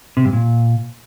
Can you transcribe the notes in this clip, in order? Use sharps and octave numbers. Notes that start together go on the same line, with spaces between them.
C3
G2
A#2